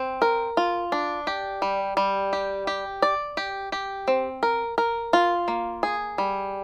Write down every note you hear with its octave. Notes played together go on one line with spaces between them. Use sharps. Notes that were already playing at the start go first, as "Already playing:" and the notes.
Already playing: C4
A#4
F4
D4
G4
G3
G3
G4
G4
D5
G4
G4
C4
A#4
A#4
F4
A#3
G#4
G3